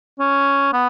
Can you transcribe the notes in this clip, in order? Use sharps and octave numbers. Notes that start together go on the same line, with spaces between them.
C#4
B3